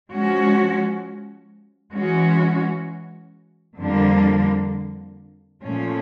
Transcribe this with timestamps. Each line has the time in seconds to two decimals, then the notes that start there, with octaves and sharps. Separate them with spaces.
0.11 F3 G#3 C#4 F#4
1.95 E3 G#3 C#4 F#4
3.80 F2 D3 G3 A#3 D4
5.64 A#2 F3 A3 C#4